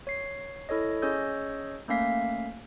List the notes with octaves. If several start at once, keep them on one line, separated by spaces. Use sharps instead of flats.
C#5 C7
E4 A4 C#5 D#5
C#4 G#4 C#5 D#5 E6 G6
A3 A#3 C#4 F5 B6